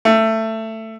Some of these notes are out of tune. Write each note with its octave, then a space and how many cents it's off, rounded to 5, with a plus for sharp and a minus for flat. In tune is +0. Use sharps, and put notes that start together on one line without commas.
A3 +15